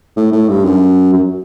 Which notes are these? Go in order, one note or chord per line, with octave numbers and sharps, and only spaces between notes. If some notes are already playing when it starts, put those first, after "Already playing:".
A2
A2
G2
F#2
F#2